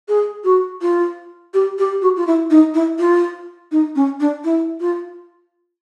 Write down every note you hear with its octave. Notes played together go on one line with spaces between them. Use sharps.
G#4
F#4
F4
G4
G4
F#4
F4
E4
D#4
E4
F4
D#4
C#4
D4
E4
F4